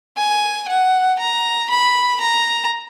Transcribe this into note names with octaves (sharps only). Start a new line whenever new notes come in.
G#5
F#5
A#5
B5
A#5